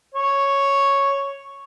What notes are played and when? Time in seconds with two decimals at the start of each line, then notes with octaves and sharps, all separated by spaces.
0.15 C#5